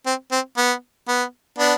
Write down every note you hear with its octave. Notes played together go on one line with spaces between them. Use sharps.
C4
C4
B3
B3
B3 D4